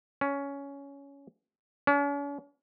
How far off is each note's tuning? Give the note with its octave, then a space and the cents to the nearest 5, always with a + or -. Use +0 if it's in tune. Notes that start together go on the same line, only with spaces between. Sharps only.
C#4 +15
C#4 +45